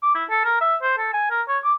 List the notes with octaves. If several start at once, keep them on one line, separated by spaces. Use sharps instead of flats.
D6
E4
A4
A#4
E5
C5
A4
G#5
A#4
C#5
D6